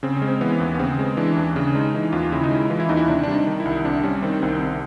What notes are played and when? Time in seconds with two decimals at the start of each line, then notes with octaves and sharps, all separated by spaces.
0.03 C#3 C4
0.17 C#4
0.22 G#3
0.28 C4
0.41 E3 B3
0.60 D#2
0.74 B3
0.79 C#3 C4
0.99 G#3
1.17 E3 D4
1.37 D#2
1.55 C#3 D4
1.75 G#3 D#4
1.94 E3 D#4
2.12 D#2 F4
2.32 C#3 E4
2.43 D#4
2.51 G#3 E4
2.70 E3 F4
2.80 E4
2.89 D#2 D#4
2.97 E4
3.08 C3 D4
3.23 G3 D4
3.34 D#4
3.47 D#3
3.60 E4
3.65 C2
3.85 C3 D4
4.03 G3 C#4
4.23 D#3 C4
4.42 C2 C4
4.62 C3